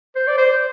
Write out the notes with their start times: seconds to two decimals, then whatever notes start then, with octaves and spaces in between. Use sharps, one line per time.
0.16 C5
0.28 D5
0.38 C5